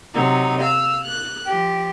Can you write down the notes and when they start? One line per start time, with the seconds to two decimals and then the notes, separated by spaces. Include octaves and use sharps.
0.13 C3 F#3 D#4
0.61 F5 E6
1.03 F#6
1.45 F3 G4